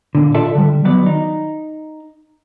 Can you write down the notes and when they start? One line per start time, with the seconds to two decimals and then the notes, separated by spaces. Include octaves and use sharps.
0.15 A#2 D3
0.34 F4 A4 D5 E5 A5
0.55 D3 G3
0.84 D#3 F#3 B3 D5
1.06 D#4